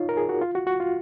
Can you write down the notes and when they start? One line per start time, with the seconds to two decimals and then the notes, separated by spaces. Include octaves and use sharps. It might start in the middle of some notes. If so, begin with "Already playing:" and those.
Already playing: D#4 F4 C#5
0.09 A#4
0.17 G#4
0.29 F#4
0.41 F4
0.55 F#4
0.67 F#4
0.80 F4